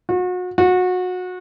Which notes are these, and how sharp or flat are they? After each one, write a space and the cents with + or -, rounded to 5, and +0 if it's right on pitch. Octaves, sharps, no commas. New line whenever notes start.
F#4 -35
F#4 -25